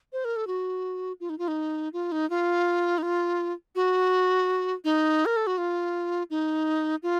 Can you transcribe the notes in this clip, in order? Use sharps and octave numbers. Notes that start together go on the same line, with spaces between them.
C5
A#4
A4
F#4
F4
D#4
F4
D#4
F4
D#4
F4
D#4
F4
F#4
D#4
A#4
A4
F#4
F4
D#4
F4